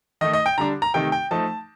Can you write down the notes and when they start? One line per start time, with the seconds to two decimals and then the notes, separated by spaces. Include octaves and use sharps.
0.21 D#3 A3 D#4 D#5
0.33 D#5
0.46 G5
0.58 D3 G3 D4 A#5
0.82 A#5
0.94 C3 D#3 A3 D#4 G5
1.12 G5
1.31 F3 A3 D#4 A5